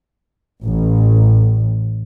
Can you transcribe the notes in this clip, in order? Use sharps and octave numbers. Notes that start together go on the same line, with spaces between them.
A1